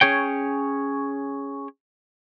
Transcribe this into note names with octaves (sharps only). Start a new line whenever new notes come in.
C#4 G#4 C#5 G5